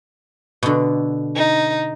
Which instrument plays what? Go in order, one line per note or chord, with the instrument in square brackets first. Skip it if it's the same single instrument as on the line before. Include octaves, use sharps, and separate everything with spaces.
[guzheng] B2 D3
[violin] D#4